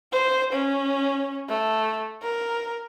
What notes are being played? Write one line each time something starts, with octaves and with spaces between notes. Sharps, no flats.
C5
C#4
A3
A#4